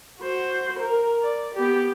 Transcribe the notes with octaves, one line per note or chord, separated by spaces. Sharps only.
F#4 C5
A#4
D5
B3 G4